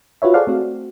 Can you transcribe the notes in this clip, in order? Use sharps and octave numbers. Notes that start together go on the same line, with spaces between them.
F4 F#4 B4 C#5 E5
G#4 A4 C5 D5 F5 F#5
A3 C4 F#4